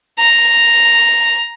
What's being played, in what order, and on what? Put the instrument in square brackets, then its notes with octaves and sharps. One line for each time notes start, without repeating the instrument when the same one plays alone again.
[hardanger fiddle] A#5